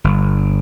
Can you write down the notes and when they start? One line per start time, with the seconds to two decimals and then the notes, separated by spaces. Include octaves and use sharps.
0.04 G1